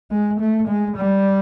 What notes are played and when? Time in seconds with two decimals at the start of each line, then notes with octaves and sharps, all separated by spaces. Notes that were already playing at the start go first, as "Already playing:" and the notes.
0.11 G#3
0.40 A3
0.68 G#3
0.96 G3